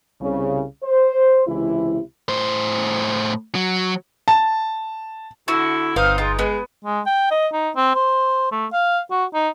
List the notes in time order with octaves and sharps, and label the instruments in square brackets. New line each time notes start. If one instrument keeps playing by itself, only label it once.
[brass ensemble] C2 C#3
C5
C#2 C3 E3 E4
[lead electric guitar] A2 C5
F#3
[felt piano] A5
[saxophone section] D3 E4 [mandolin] F#4
[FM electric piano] G1 B4 [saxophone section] C4 D#4 C5 [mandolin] F5
[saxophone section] G#3 D#4 [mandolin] F4
[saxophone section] G#3 [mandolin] B3
[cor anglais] G#3
G5
D#5
D#4
C4
C5
A3
F5
F#4
D#4